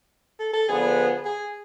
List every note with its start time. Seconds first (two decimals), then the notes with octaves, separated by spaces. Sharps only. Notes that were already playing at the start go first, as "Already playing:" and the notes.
0.39 A4
0.53 A4
0.68 D3 F3 B3 G#4
1.25 G#4